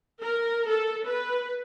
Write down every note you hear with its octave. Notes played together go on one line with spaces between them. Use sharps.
A#4
A4
B4